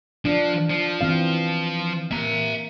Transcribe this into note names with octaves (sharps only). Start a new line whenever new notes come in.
F3 D4
F3
E3 C4 F5
A#3 E5 A#5